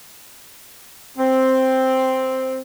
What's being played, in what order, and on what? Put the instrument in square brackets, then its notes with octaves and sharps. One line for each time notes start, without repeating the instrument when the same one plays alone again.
[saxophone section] C4